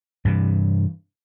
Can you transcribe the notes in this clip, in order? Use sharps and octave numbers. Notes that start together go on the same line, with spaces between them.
G2 C3 E3